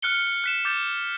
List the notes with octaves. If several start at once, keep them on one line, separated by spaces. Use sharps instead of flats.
F6 F#6 C#7 G7
F#6 B6 E7
D6 G6 A6